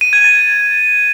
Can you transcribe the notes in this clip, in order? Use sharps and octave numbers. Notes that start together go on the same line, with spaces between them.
D#7
G#6
A6